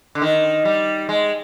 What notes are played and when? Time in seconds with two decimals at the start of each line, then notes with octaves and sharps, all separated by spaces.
0.15 D3
0.22 D#3
0.65 G3
1.09 G#3